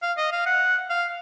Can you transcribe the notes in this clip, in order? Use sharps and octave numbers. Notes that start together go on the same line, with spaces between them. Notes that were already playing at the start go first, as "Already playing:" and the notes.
F5
D#5
F5
F#5
F5